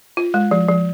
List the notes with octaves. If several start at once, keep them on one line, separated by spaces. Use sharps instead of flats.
F4
G#3
F3
F3